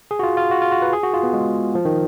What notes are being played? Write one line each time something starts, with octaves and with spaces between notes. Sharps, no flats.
G#4
F#4
F4
F4
F#4
F4
F#4
B4
G#4
F#4
F4
B3
G#3
F3
D#3